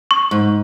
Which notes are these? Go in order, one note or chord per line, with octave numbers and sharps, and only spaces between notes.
C#6
G#2